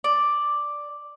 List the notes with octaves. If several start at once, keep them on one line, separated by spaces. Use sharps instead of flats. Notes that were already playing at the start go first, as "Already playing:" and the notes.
D5